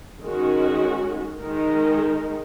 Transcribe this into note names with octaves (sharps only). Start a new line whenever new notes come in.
D#3 G#3 C#4 F#4
D#3 G#3 D#4 A#4